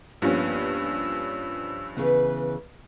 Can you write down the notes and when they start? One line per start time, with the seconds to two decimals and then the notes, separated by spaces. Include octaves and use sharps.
0.22 G2 F3 A#3 B3 C#4 E6
1.97 C#3 E3 B3 B4